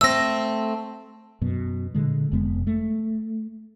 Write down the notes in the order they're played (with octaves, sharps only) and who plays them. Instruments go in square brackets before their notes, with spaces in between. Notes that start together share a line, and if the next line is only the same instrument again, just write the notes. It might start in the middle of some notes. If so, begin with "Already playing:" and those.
[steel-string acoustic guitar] A3 C4 [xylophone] E6 A#6
[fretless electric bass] F#2 B2
A#2 D3 G#3
F1 F2 G#3 B3
A3